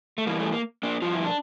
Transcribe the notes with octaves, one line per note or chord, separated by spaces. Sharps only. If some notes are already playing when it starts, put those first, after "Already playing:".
A3
E2 E3 G3 A#3
A3
A#3
A#3 D4
G2 F3 F4
E4
D4